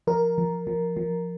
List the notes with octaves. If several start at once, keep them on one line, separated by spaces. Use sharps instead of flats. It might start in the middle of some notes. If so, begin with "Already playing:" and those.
F3 A#4
F3
F3
F3